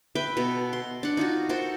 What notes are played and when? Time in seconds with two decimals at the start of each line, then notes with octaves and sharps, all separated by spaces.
0.15 B4 E5 G5
0.37 B2 A4
0.73 C6
1.03 D4 F#5
1.17 D#4 F4 F#4
1.49 F#4 A4 A#4 C5